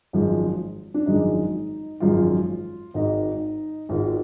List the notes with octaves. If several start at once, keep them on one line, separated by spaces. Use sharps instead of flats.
G#1 F#2 F3 G#3
D4
G#1 F#2 F3 G#3 D#4
G#1 F#2 F3 G#3 F4
G#1 G#2 D#3 D#4
G#1 G#2 D#3 F4